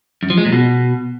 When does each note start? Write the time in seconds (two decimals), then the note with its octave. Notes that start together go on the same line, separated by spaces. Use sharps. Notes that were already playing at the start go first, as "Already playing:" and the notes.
0.23 F#2
0.30 F3
0.38 G#3
0.45 A#2
0.53 B2